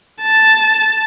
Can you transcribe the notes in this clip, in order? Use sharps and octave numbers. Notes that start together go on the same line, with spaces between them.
A5